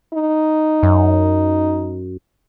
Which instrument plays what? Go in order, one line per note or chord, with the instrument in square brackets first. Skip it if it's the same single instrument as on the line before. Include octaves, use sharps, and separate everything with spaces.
[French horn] D#4
[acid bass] F#2